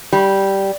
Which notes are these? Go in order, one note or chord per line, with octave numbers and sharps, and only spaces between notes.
G3